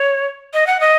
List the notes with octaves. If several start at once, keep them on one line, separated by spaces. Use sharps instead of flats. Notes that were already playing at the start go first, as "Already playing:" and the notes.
Already playing: C#5
D#5
F#5
D#5